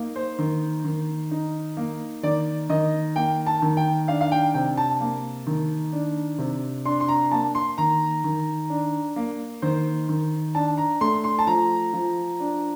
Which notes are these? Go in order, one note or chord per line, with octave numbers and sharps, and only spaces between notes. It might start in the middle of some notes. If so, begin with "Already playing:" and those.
Already playing: A#3 D#4
C5
D#3
D#3
D#4
A#3
D#3 D5
D#3 D#5
A#3 G5
A5
D#3
G5
D4 F5
F5
G5
C3 G5
A5
A#3
D#3
D4
C3
D4 C6
C6
A#5
A#3 A5
C6
D#3 A#5
D#3
D4
A#3
D#3 C5
D#3
D4 A5
A#5
A3 C6
C6
A5
F3 A#5
F3
D4